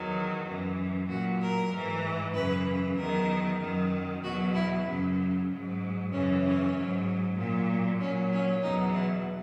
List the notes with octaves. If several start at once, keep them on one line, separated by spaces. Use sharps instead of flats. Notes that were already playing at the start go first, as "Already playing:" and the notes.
Already playing: E2 D#3 F#3
F#2 E3
A#2 F#3 F#4
A#4
G#2 E3
F#2 C#3 E3 B4
E2 D#3 F#3 A#4
F#2 D#3 F#3
E2 B2 F#3 F#4
E4
F#2 C#3 F#3
G#2 F#3
F#2 C#3 E3 C#4
C#4
G#2 F#3
A#2 F#3
A#2 F#3 C#4
C#4
E2 B2 F#3 D#4
E4